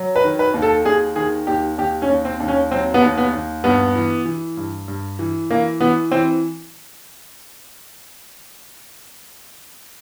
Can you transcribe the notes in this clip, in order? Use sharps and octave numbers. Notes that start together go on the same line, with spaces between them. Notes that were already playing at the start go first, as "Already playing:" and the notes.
Already playing: F#3
B4
D#3
B4
D#2
A4
D#2 G#4
D#3 G#4
D#2 G4
D#2 G4
C#4
D#2
C4
D#2
C#4
F#3 C4
B3
D#2
B3
D#2
G2 B3
E3
E3
G2
G2
E3
E3 A#3
E3 B3
E3 C4